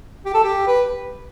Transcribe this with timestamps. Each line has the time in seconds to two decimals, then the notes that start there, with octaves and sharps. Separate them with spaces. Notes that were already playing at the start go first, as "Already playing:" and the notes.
0.26 G4
0.35 A4
0.44 G4
0.67 B4